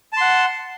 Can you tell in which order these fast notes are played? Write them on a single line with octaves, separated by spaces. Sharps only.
A5 C6 F#5